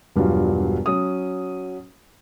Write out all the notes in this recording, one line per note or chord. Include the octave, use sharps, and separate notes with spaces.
E1 G2 F#3 F4
F#3 C#4 D#6